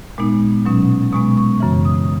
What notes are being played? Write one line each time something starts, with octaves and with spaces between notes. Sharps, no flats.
A#2 G#3 B3 D#4
B2 F#3 C#4
B2 G#3 B3 C#6
C#6
F#2 C#3 E3
D#6